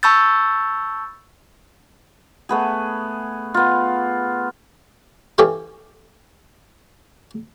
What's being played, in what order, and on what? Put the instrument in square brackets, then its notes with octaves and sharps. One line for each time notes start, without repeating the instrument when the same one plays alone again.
[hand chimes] A5 B5 C#6 E6 G6 A6
[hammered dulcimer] A3 B3 G#4
B3 F4
[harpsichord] E3 C#4 G4 A4 F5 C6